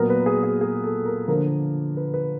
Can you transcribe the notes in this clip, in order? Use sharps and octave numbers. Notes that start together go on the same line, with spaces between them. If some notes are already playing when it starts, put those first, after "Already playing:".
Already playing: A#2 F#3 B3 A#4
B4
G#4
G#4
G#4
A4
A#4
D3 F3 A#3 D4 A#4
B4
B4